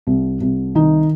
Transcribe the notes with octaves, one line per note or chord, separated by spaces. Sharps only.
C2
C2
D#3 D#4